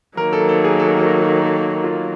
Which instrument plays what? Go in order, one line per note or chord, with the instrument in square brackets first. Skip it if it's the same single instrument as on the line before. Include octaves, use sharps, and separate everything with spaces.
[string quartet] D#3 F#3 A#3 [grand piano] A#4
[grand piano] A4
A4
G#4
A4
A4
A4
A4
F4